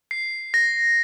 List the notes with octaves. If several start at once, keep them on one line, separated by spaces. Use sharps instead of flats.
C7
A#6